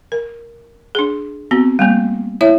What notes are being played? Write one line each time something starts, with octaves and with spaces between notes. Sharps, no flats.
A#4
D4 G#4
B3 C4 F#4
G3 A3 A#3
E4 C#5 E5